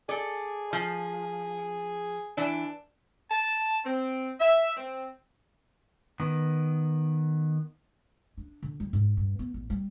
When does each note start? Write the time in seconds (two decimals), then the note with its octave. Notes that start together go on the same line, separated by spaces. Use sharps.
0.09 G#4 A4 D5
0.73 F3
2.37 E3 D4
3.31 A5
3.85 C4
4.40 E5
4.77 C4
6.20 D#3 B3
8.38 D4
8.63 D3
8.80 G3
8.93 G#2
9.17 G2
9.39 B3
9.54 A1
9.70 G3